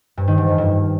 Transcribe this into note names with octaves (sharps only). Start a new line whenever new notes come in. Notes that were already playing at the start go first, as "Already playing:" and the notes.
G2
D#3
G#2
F2
G2